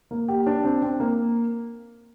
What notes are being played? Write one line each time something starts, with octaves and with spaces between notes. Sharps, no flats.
A#3
G4
D4
C4
C4
A#3